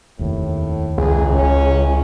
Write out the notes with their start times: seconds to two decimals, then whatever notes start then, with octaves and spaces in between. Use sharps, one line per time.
0.19 F1 D#2 A2
0.98 C#2 G#4
1.35 C#4